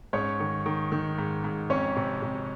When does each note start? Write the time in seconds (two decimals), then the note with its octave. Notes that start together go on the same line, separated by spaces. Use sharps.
0.13 G#2 C#4 C#5
0.40 D#3
0.66 D#3
0.92 D#3
1.18 G#2
1.44 G#2
1.70 F2 C#4 C#5
1.96 C3
2.22 C3